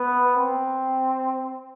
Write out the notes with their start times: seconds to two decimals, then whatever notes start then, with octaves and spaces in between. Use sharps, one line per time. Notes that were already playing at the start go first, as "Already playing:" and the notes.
Already playing: B3
0.36 C4